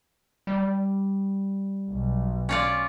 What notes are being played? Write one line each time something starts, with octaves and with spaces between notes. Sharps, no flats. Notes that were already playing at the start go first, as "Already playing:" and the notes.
G3
B1
C#4 F4 D5